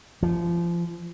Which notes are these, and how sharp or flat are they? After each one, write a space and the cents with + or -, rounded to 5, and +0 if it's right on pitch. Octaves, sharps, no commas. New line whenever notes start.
F3 -30